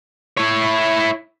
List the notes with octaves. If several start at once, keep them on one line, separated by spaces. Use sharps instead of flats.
E4 C#5